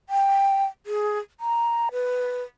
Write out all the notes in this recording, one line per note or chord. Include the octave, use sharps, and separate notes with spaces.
G5
G#4
A#5
B4